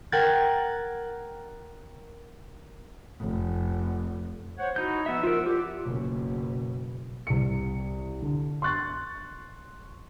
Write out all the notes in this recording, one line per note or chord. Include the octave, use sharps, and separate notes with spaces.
A#4 F#5 G5 F#6 G#6 A6
F1
C5 C#5 F#5
D#4 E4 F#4 G6
F3 B3 E5 F#5 E6
F4 A#4
F4 G4 D5
F#1 B2
C2 C#7
D3
C6 C#6 F#6 A6